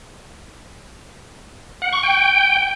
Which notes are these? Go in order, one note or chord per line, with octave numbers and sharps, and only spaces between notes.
F#5
C#6
G5